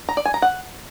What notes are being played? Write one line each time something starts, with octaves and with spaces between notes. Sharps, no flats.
A#5
D5
G#5
A#5
F#5